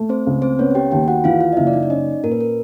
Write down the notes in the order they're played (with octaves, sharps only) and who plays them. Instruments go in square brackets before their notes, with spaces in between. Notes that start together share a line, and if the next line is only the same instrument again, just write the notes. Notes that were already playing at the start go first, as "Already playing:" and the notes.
Already playing: [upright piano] A3
[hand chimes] C4 C5
[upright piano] C#2
[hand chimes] C4 C5
[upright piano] B3 [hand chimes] C#4 C#5
[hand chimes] G4 G5
[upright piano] D#2 [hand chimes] G4 G5
[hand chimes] F#4 F#5
[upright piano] E3 [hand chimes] F4 F5
[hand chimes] F4 F5
D#5
[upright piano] F#1 [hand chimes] E4 E5
[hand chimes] D5
D#4 D#5
D5
[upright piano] C#4 [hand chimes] D#4 D#5
[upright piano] A#2 [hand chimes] A#4
[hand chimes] B4
A#4